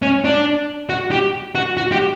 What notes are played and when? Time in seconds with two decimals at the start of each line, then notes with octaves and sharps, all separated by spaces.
0.02 C#4
0.24 D4
0.89 F#4
1.11 G4
1.55 F#4
1.77 F#4
1.92 G4